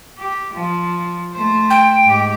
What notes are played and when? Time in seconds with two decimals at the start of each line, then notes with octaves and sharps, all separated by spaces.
0.18 G4
0.53 F3
1.33 A3 C5
1.70 G5
2.03 G#2 G4